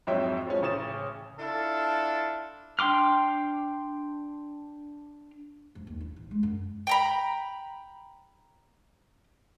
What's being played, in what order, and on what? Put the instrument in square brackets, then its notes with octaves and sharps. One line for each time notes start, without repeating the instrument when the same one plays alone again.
[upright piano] F2 G#2 F#3 C#5 E5 G5
F3 G#3 C#4
A1 C#3 C#4 D#6 A6 E7
[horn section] D4 E4 F4 A4
[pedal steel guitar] D4 G5 C6 D6 F6
[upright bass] F2
D#2
E4
A1
G#3
F#2
[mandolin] G5 A#5 B5